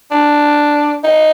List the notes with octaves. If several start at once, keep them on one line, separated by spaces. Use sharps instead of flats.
D4
D#4